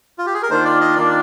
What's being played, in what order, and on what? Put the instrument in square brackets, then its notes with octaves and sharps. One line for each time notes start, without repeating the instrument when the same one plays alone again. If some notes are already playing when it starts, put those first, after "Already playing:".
[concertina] F4
G4
G#4
A#4
[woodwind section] D#3 A#3 D4 F4 [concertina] C5
[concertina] D5
D#5
[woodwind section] D#3 A#3 D4 F4 [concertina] D5